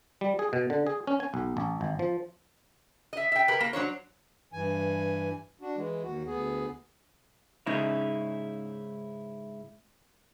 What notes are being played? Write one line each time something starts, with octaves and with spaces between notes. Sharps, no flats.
G3
G#4
B2
D3
G#4
C#4
G#5
B1
A1
G#1
F3
D#5 E5
E5 G5
G4 G#4 A#4 B4
A#3
F#3 D4 C5 C#5
G2 E3 G#5
D4 F#4
E3 G#3
D#2 F#4
D2 B3 G#4
G#2 C#3 C#4 D#4 E4